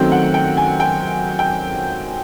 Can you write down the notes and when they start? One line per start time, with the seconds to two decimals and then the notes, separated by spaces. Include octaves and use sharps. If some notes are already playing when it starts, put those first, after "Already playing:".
Already playing: F#2 D#3 F#3 A3 C4 G5
0.12 F#5
0.34 G5
0.57 G#5
0.80 G5
1.39 G5